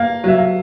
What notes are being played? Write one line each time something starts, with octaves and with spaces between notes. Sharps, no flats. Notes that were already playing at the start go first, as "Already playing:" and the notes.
Already playing: A#3 F5
F#3 E5
F5